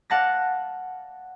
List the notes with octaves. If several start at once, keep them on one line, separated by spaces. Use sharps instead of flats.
D5 F5 F#5 A5 A6 A#6